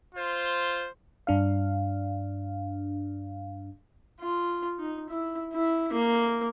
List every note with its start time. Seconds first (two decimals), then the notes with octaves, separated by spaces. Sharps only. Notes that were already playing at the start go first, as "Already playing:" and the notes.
0.15 F4 C5
1.27 G2 D4 F5
4.20 F4
4.79 D#4
5.09 E4
5.53 E4
5.92 A#3